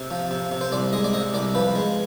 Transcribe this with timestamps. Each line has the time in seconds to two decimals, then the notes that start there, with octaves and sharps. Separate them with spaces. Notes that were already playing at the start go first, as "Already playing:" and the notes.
Already playing: C3
0.11 F3
0.31 C3
0.52 C3
0.61 C5
0.72 C2 D5
0.93 G#3 D#5
1.04 D5
1.13 C3 D#5
1.34 C2 D5
1.55 F3 B4
1.75 G#3